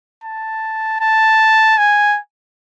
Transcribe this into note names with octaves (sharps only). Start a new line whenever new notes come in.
A5
A5
G#5